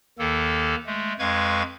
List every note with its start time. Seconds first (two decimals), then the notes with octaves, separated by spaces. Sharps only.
0.19 D#2 D#3 A#3 A4
0.86 G#3 A3
1.19 F2 G#3 B4 F5 C#6 G#6